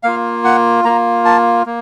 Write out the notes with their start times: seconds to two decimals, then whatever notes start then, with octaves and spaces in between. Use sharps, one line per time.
0.03 A#3 F4 F5
0.44 F#5
0.84 A#3 F4 A#5
1.25 A5
1.66 A#3